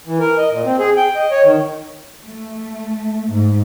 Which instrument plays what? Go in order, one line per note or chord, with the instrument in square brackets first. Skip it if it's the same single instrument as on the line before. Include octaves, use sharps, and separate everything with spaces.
[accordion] E3
A#4
D#5
A#2
C4
G#4
G5
D#5
C#5
D#3
[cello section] A3
G#2